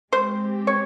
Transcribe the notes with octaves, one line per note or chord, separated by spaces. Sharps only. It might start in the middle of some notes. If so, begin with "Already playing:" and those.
G#3 C4 G4 C5
C#5